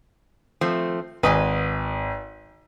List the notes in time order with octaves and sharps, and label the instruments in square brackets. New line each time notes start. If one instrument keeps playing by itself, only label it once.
[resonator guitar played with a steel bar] F3 A3 C4
[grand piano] G#1 D#6 [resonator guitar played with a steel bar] B4 D#5 G#5